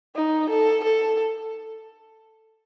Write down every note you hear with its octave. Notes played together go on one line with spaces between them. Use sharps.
D#4
A4
A4